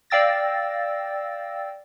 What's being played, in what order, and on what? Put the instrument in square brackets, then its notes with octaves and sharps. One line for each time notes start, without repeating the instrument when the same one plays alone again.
[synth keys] D5 F5 G5 E6 A6 A#6